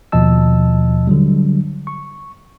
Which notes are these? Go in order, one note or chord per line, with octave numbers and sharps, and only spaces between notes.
D#2 B2 F3 D#5 A5 E6
D3 F#3 G3
C#6